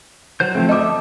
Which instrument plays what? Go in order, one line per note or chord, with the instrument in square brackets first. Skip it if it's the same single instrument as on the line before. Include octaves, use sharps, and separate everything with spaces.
[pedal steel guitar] F#3 C5 G6
[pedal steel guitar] F3 G3 C4 [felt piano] A3
[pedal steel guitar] A4 E5 [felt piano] D#5 D6